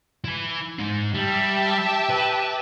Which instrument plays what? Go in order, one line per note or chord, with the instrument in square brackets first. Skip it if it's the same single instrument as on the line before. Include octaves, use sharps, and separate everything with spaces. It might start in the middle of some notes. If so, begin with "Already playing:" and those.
[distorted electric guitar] E4 G#5
G#3 D#4
[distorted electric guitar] G3 [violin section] G4 E5 A5
[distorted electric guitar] B4